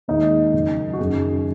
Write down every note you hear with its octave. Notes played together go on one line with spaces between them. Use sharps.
D#2 D#3 G#3 D#4 D#5
F#1 F#2 F#3
F#4
F#1 F#2 D#3 F#3 G#4